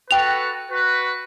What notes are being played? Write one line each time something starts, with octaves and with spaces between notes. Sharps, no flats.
F#4 A4 B4 G5 F7
F#4 B4